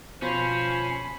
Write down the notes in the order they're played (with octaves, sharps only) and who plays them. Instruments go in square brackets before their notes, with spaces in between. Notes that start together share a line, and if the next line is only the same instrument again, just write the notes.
[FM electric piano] B2 [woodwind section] F3 C5 [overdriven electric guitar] C#4 [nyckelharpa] B5